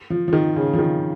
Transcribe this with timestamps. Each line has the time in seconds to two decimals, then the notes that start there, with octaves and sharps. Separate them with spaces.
0.10 F3
0.28 F3
0.33 D#3
0.56 C#3
0.73 F3
0.78 D#3